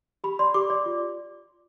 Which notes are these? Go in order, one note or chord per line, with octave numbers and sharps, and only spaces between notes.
G4 B5
D5 C6
G4 D6
D5
F4